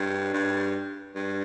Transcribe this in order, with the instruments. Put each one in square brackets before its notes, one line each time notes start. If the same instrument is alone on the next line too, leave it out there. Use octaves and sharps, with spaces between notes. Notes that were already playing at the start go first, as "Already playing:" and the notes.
Already playing: [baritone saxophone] G2
G2
G2